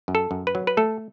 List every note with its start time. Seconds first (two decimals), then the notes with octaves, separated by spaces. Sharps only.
0.08 F#2
0.15 A4
0.31 F#2
0.47 B4
0.55 F#3
0.67 B4
0.77 A3 A4